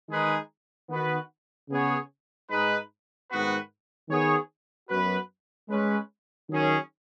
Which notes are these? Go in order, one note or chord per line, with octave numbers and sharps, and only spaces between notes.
D#3 G#3 D#4 G#4 B4
D#3 B3 F#4 B4
C#3 B3 G#4 C#5
G#2 G#3 D#4 B4
G#2 D#3 B3 F#4 B4
D#3 B3 G#4 C#5
F#2 F#3 B3 F#4 B4
G#3 C#4 B4
D#3 F#3 C#4 G#4